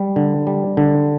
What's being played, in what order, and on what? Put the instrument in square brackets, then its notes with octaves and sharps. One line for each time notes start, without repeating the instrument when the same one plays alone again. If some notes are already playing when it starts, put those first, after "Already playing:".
Already playing: [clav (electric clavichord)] G3
D3
G3
D3